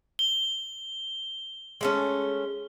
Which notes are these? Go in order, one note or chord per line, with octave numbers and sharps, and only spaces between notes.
G7
G#3 A3 C#4